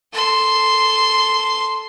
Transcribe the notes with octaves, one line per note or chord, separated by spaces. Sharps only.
A4 C6